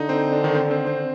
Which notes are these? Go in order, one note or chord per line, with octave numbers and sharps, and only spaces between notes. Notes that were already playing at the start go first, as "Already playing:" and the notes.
Already playing: D3 D#4 D#5
C4 C5
D4
D#3 D#4
C4 C5
C4 C5
C4 C5